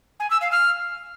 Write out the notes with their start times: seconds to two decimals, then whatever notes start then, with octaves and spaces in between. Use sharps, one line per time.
0.20 G#5
0.30 E6
0.41 F5
0.52 F6